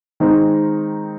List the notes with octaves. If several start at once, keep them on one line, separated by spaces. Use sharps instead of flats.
D#3 G#3 C4 D#4